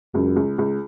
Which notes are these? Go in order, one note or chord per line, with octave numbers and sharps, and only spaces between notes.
C#2 F#2
C#2
C#2